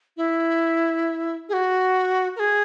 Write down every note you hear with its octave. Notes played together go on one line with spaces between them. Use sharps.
E4
G#4
F#4
A#4
G#4